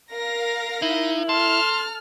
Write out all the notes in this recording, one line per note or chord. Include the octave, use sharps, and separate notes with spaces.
A#4 F5 A#6
D#4 E4
A4 A5 C6 F6